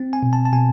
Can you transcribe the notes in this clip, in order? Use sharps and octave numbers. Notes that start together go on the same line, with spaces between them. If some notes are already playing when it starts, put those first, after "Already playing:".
Already playing: C4
G#5
B2
A5
A5
B2 G#5